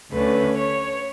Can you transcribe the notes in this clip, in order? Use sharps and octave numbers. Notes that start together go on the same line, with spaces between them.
D2 D3 A3 C#4 B4
C#5